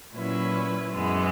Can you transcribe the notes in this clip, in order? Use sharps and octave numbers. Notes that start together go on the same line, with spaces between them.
A#2 F#3 C#4 E4 B4
F#2 E3 G#3 B3